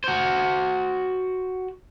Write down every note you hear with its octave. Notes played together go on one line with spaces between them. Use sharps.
F#4 C5